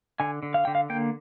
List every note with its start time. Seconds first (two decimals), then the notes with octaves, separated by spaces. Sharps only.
0.20 D3 G#5
0.43 D3
0.54 F5
0.65 D3 G5
0.75 F5
0.90 A#3 G5